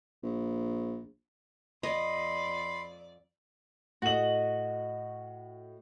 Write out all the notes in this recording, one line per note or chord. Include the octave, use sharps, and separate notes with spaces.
A#1
F2 D5 D#5 B5 C6
A2 F#4 D#5 F#7